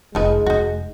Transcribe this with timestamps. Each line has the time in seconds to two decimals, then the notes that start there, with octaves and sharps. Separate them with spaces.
0.15 F1 F3 G#3 D#4 B4
0.46 F1 D#4 F#4